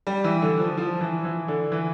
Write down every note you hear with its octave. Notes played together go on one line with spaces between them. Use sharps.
G3
E3
D3
F3
F3
E3
E3
D3
E3